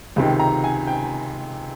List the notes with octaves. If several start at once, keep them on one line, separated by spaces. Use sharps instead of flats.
C#2 C3 D#3
A#5
G#5
G5